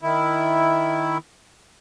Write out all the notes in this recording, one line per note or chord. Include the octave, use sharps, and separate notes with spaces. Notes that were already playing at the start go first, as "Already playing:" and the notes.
D#3 E4